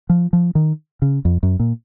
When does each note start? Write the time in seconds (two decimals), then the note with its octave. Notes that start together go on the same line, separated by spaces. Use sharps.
0.10 F3
0.33 F3
0.55 D#3
1.02 C#3
1.25 F2
1.43 F#2
1.60 A#2